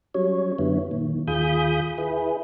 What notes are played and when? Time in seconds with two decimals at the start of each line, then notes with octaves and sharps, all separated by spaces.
0.14 F#3 G3 C#4 C#5
0.59 F#2 D3 B3 E4
0.91 A#2 D#3
1.28 D#2 F4 G#4 B5 D#6 G6
1.98 E4 G#4 B4